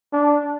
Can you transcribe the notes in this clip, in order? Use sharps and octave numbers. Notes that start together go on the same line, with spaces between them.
D4